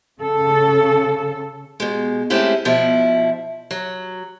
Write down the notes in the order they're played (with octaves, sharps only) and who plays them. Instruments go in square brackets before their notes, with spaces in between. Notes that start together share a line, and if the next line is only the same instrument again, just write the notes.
[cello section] C#3 A4
[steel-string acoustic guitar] B2 G#3
G#3 A3 C4 C#4 E4 G4
B2 F3 E4
F#3